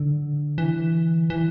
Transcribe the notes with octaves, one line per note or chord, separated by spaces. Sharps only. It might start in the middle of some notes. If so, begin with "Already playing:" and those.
Already playing: D3
E3
E3